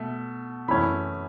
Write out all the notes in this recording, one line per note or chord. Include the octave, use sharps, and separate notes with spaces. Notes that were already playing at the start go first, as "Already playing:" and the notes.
Already playing: B2 A3
F#2 E3 A3 C#4 B5